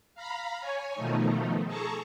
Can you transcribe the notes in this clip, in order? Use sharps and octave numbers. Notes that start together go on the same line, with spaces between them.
F5 A#5 B5
C#5 G#5
B2 D#3 F3 A3 D#4
G#4 A4 A5 A#5 C#6